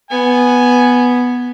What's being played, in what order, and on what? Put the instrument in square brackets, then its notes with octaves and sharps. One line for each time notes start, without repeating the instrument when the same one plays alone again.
[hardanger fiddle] B3 [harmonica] G#5